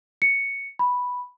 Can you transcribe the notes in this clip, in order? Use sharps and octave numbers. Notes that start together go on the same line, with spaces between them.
C#7
B5